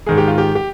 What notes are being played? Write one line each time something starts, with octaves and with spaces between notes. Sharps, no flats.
G#2 D#3 G#3 G#4
G4
F4
G4
G4